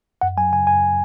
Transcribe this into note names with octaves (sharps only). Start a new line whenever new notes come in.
F#2 F#5
F#3 G#5
C#3 G#5
F#2 G#5